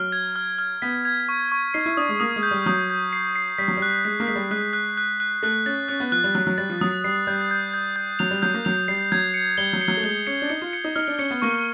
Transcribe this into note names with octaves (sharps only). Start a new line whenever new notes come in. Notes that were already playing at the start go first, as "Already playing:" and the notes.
Already playing: F#3 F6
G#6
F6
F6
B3 B6
G#6
C#6
C#6
D#4 C7
E4
D4 D#6
G#3
A#3 D#6
G#3
G6
G3
F#3 D#6
G6
C7
C7
G3 B6
F#3
G3
F#6
G#3 B6
A#3
G#3 B6
G3
G#3 F#6
F#6
F#6
F#6
A3 F#6
C#4 A6
C#4 F#6
B3
F3 F#6
G3
F#3 F#6
F#3
G3 A6
F3
F#3 D#6
G3 C7
G3 G6
G6
G6
G6
F#3 F7
G3
F#3 G6
A#3
F#3 F7
G3 C7
F#3 G#6
C#7
G3 G7
F#3
C#7
F#3
A3
G#3 G7
C#4 C#7
D4
D#4 C#7
F4
C#7
D#4
D#4 F6
D4
C#4 C#7
B3
A#3 C#6